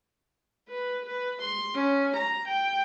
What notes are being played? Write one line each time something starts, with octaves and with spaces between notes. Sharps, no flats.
B4
B4
C6
C#4
A#5
G5